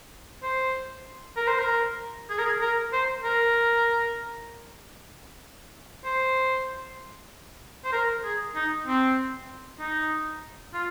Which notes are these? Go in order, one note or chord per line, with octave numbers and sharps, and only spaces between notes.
C5
A#4
C5
A#4
G#4
A#4
G#4
A#4
C5
A#4
C5
C5
A#4
G#4
D#4
C4
D#4
F4